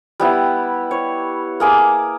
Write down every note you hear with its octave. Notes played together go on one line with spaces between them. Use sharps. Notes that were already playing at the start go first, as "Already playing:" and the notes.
G3 B3 E4
C#5
A#3 G#4 D6